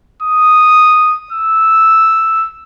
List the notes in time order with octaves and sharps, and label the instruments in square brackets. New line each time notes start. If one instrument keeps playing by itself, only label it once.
[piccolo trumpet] D#6
E6